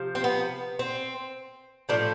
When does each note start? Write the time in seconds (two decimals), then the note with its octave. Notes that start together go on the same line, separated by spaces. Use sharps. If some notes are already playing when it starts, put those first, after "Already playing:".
Already playing: C3 F3
0.15 C4
0.24 B3
0.79 C4
1.89 A2 F3 A3 D4